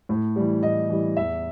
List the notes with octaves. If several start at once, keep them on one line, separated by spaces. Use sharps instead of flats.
A2
E3 G3
A2 D#5
E3 G3
E2 E5